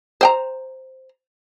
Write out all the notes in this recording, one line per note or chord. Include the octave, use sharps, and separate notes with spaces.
C5 G5 A#5